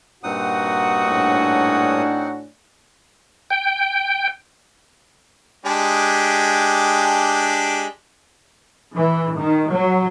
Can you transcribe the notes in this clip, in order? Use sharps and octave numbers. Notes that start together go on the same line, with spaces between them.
G2 A#2 C4 D#4 F#4 F#5 D#6
A2 C#4 D4
G5
G#3 D4 G4
E3
D#3
F#3